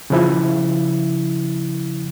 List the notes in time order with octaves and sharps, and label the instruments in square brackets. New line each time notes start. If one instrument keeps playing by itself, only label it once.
[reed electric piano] C#3 F3 E4